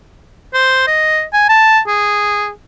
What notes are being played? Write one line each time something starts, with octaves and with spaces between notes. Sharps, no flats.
C5
D#5
G#5
A5
G#4